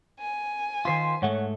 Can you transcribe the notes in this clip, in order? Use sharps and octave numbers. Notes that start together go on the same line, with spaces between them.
G#5
D#3 F4 C5 B6
G#2 A3 C#5 F#5